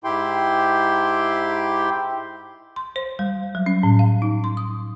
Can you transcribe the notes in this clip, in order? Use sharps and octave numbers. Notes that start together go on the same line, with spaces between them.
G#2 E4 G4 G5 C6
C6
C5
G3
F#3
C#4
A2
F5
D#4
C6
D#6